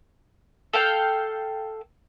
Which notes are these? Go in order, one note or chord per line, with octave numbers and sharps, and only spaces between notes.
A4 F5 G5